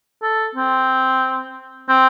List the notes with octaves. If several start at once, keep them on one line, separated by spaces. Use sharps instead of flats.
A4
C4
C4